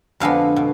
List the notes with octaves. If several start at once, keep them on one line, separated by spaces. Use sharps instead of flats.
F2 D3 G#3 B3 F5
B2